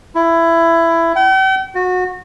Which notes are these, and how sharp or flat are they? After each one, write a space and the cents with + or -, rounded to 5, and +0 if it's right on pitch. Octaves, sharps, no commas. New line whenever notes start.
E4 +15
G5 -45
F#4 -25